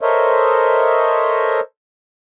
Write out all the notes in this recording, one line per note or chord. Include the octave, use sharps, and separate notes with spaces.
A4 A#4 C5 C#5 D#5 E5